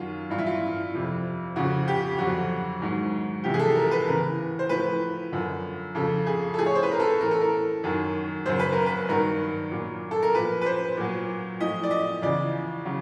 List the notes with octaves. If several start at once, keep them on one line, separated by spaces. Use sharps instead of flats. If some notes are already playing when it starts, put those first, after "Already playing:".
Already playing: F#2 D#3 F#3 F4
G2 E3 F4
E4
F4
F2 C3 F3
F2 C#3 F3 F#4
G4
F2 D3 F#3 F#4
G#2 D#3 F#3
E2 C3 F3 G4
G#4
A4
A#4
B4
E2 C#3 E3 A#4
C5
A2 F3 B4
F#2 D3 F3
F2 C#3 F3 A4
G#4
A4
A2 F3 G#4
C#5
C5
B4
A#4
A4
A2 E3 A#4
A4
A#4
F#2 D#3 F#3
F#2 C#3 F#3 C5
B4
A#4
B4
G2 D#3 F#3 A#4
A#2 F#3
A4
A#4
A#2 F3 B4
B4
C5
A#2 F#3
A2 F3 D#5
D5
D#5
E2 C#3 F3 D5
C#3 F#3